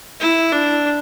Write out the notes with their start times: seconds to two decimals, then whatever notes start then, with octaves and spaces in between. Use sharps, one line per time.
0.20 E4
0.52 D4